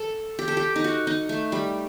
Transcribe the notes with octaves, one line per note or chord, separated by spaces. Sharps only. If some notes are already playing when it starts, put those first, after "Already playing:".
Already playing: A4
G4
A4
G4
D#4
F#4
D#4
A3
G3